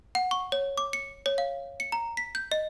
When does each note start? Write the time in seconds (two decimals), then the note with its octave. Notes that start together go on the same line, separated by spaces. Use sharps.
0.15 F#5
0.31 C#6
0.52 C#5
0.77 D6
0.93 C#7
1.26 C#5
1.38 F5
1.80 C#7
1.92 A#5
2.17 B6
2.35 G6
2.52 D#5